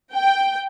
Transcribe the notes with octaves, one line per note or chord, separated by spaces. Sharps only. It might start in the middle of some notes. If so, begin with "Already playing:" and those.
G5